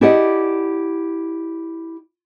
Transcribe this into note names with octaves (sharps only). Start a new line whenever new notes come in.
E4 G4 G#4 D5 D#5 F#5